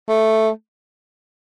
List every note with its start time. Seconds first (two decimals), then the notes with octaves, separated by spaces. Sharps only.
0.08 A3